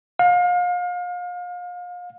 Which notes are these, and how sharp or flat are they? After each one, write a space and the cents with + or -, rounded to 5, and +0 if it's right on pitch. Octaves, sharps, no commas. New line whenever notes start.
F5 +35